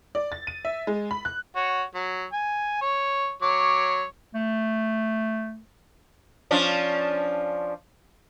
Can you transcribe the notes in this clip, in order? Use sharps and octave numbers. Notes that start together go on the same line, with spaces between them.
D5
A6
D#7
E5
G#3
B5
F#6
F#4 C#5
F#3
G#5
C#5
F#3 C#5 D6
A3
F3 C#4 D4